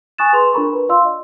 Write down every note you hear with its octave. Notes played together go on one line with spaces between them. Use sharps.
G#5 C#6 D#6 F#6 A6 E7
G#4 B4 C6 F7
D4 F4 A#4 A#5 B5 C#6
B4
F4 D5 F5 C6 E6
D#5